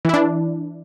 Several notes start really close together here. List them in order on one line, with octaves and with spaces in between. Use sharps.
E3 E4 D4